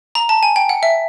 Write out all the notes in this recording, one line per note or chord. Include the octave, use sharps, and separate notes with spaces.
A#5
A5
G#5
G5
F#5
E5